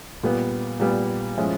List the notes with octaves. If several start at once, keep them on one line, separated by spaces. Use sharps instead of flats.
A#2 G3 B3
A#2 G3 B3
F3 G#3 C#4 E4